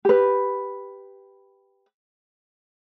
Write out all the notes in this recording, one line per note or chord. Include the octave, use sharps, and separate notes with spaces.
G4 B4